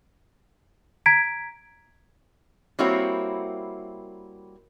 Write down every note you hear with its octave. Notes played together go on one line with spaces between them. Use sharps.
A#5 G#6 B6 D7
G3 A#3 C4 E4 F#4 C#5